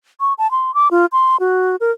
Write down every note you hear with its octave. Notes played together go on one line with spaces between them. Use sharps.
C#6
A5
C6
D6
F4
C6
F#4
A#4